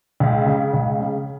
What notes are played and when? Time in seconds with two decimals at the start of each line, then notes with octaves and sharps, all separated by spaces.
0.20 C#2
0.46 C#3
0.74 C#2
1.00 C#3